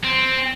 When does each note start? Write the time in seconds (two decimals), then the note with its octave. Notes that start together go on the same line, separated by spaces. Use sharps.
0.04 C4